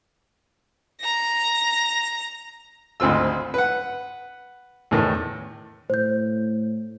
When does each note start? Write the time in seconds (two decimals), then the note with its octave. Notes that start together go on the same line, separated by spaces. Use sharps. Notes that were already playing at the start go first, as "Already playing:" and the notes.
1.01 A#5 A#6
3.00 G#1 D2 C4 F4 E6
3.54 B4 F#5
4.91 E2 A2 D#3
5.90 A2 C5 G6